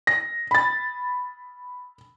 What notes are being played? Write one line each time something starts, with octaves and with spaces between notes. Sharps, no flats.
A#6
B5 A6